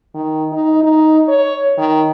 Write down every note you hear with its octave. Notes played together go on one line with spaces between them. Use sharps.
D#3
D#4
D#4
C#5
D#3